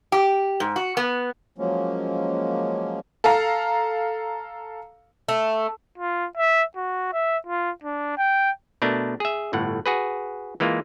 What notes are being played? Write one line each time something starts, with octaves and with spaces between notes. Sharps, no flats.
G4
G#2
F#4
B3
F3 F#3 G#3 A#3 C#4
A4 F5 A#5
A3
F4
E5
F#4
E5
F4
D4
G5
B2 A3 D4 A#4
G#4 E5
G1 A2 F#5
F#4 G#4 B4
E3 G#3 A#3 F4